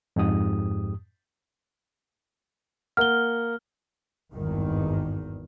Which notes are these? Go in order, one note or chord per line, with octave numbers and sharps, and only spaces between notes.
F2 G#2 G4 D#6
A#3 A#4 F#5 F6 G7
G#1 E2 G2 D#3